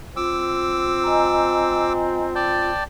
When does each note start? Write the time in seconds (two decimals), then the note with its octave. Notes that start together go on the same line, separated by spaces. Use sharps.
0.17 C4 F4 D6 E6
1.03 D#5 G#5 A#5
2.35 D5 G5 A5